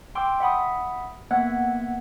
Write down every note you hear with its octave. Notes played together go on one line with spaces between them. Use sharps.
G5 C6 D6 E6
E5 F#5 B5 D#6
A#3 B3 E5 F#5 F#6 G#6